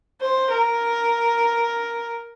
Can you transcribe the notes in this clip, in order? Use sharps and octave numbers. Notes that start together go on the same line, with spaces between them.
C5
A#4